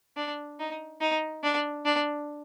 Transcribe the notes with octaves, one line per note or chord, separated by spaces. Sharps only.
D4
D#4
D#4
D4
D4